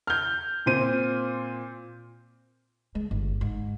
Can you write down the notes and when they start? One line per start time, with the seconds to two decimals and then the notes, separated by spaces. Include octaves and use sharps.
0.07 F6 G6
0.66 A#2 C4 D#7
2.95 G#3
3.11 G1
3.41 G#2